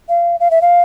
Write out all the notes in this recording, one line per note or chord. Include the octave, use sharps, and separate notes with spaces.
F5
F5
E5
F5